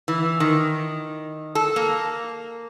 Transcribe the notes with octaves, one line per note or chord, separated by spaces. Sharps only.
E3
D#3
A4
A#3